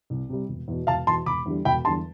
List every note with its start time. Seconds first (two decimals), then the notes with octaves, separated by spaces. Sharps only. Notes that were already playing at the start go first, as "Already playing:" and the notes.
0.10 C2
0.29 C3 G3
0.49 E1
0.68 E2 B2
0.87 E1 F5 A5
1.07 E2 B2 A5 C6
1.26 E1 B5 D6
1.46 E2 D3 G3
1.65 E1 G5 B5
1.84 E2 D3 G3 A5 C6